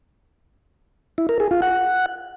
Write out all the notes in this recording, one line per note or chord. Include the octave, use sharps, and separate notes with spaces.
E4
A#4
G#4
F4
F#5